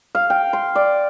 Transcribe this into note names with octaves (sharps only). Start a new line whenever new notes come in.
F5
G5
C6
D5